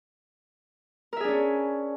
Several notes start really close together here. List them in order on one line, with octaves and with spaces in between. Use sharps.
A#4 E5 G#4 D4 C#4